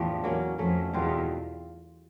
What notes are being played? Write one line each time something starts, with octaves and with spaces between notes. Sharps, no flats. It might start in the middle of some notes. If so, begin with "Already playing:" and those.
Already playing: E2 A2 F3 A3 D4 G4
F#3 A#3 C#4
F2 F#3 A3 C#4
E2 B2 G3 C4 F4